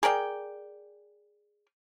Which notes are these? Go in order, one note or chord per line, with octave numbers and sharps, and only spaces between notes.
G#4 A#4 D5 G5